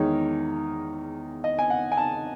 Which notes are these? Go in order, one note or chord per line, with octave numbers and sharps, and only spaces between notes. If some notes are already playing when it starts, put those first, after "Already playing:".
Already playing: E2 D#3 G#3 D#4 C#5
D#5
G#5
F#5
G#5
A5